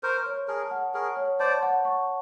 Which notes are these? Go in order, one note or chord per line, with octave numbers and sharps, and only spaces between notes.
A#4 C5 C#6
C#5
G#4 A#4 A5
F#5
G#4 A#4 C#6
C#5
C5 D5 A5
F#5
C#6